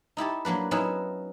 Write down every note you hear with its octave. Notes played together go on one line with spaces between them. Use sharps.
D#4 E4 G4 A4
F#3 A#3 D4 B4
F#3 B3 C#4 D#4 E4